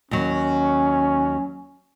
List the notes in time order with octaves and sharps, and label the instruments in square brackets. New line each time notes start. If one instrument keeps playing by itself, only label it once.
[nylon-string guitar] D#2 F#3 [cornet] C#4